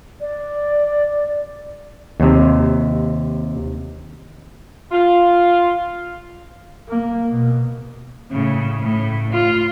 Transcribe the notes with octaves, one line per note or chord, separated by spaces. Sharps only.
D5
D#2 C3
F4
A#3
B2
A2 C#3
A2
F4